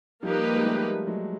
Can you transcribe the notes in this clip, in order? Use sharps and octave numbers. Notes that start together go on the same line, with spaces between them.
F3 G3 A#3 D#4 G4 B4
G#3
G3 A3
F#3 G#3